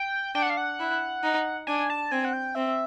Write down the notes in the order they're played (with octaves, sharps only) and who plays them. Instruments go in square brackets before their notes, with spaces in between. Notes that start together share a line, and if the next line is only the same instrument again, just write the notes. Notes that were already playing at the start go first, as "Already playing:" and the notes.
Already playing: [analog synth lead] G5
[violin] D4 [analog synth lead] G5
[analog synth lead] F#5
F5
F#5
[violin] E4
D#4
[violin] D4 [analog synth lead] G#5
[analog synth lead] A5
[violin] C4 [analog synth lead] G#5
[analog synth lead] F#5
G5
[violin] C4 [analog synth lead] E5